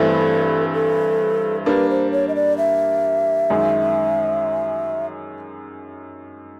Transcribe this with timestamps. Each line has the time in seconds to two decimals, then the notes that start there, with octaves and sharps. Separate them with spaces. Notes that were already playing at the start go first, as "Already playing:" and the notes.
Already playing: G2 E3 A3 C4 E4 A4
0.74 A4
1.66 G3 A#3 D4 B4
1.90 C5
2.12 C#5
2.28 D#5
2.35 D5
2.58 E5
3.50 F#2 D#3 G#3